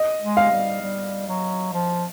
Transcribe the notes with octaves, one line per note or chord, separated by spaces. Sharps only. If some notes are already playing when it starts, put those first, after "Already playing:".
Already playing: D#5
G#3
F5
G3
G3
F#3
F3